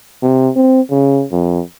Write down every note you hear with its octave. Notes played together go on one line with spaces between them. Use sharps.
C3
C4
C#3
F2